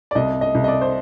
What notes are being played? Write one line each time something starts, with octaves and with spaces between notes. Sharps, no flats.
D5
C2 D#5
D#5
C2
D#5
D5
C5